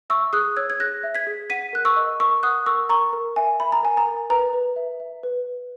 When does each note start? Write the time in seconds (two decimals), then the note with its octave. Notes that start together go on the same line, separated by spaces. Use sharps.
0.10 E5 C#6 E6
0.33 G#4 D#6 F#6
0.57 C#5 E6 G#6
0.70 G#6
0.80 G#4 F#6 A#6
1.03 E5
1.15 G#6 B6
1.27 G#4
1.50 F#5 B6 D#7
1.73 A#4 F#6
1.85 C#6 E6
1.96 D#5
2.20 A#4 C#6 E6
2.43 F#5 D#6 F#6
2.66 A#4 C#6 E6
2.89 A#4 A#5 C#6
3.13 A#4
3.36 E5 G#5
3.60 E5 B5
3.72 A#5
3.83 A#4 G#5
3.97 A#5
4.06 A#4
4.30 B4 A#5
4.53 B4
4.76 E5
5.00 E5
5.23 B4
5.47 B4